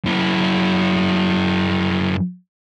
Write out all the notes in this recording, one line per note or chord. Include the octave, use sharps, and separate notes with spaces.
F#2 E4